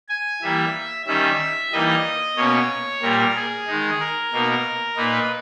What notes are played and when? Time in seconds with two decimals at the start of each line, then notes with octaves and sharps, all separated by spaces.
0.09 G#5
0.42 E3 G3 A#3 E5
1.06 D#3 G3 C#4 E5
1.72 E3 G3 A#3 D#4 D#5
2.36 B2 A#3 C#4 C#5
3.02 A#2 G3 A#3 A#4
3.35 G#4
3.67 D#3 G#3 D#4
4.00 A#4
4.32 B2 A#3 D#4
4.97 A#2 A#3 D#4 B4